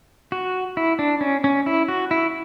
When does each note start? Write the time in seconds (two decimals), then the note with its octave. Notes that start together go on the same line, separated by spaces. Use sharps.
0.32 F#4
0.77 E4
0.99 D4
1.21 C#4
1.44 C#4
1.66 E4
1.88 F#4
2.11 E4